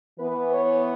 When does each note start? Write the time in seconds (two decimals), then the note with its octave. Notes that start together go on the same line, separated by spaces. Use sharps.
0.19 E3 B3 B4
0.52 C#5